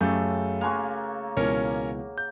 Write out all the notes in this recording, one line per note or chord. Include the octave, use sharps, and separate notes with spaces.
F#2 C#3 F#3 A3 G4 A4 G6
A#3 F#4 G#5 C6 F7
C#2 B2 E3 C#4 A#4 C#5
G6